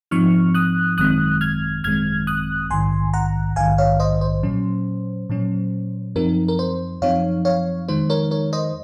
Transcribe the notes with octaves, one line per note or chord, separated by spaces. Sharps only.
G#2 F3 C4 D#4 C#6 F6
D#6 F#6
G#1 F#2 D#3 G#3 C4 D#6 F#6
F6 G#6
G#1 F#2 D#3 G#3 C4 F6 G#6
D#6 F#6
A#1 G#2 D#3 G#5 C6
F#5 A#5
A#1 G#2 D#3 F5 G#5
C#5 F5
C5 D#5
C5
A#2 F#3 C#4
A#2 F#3 C#4
F#2 F3 C4 D#4 A#4
A#4
C5
F#2 F3 C4 D#4 C#5 F5
C#5 F5
F2 D#3 G#3 D#4 C5
A#4 C#5
A#4 C#5
C5 D#5